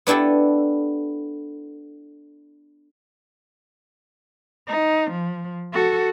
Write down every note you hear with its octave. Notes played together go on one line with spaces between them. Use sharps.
B3 D4 E4 G4 A4
D#4
F3
F#4 A4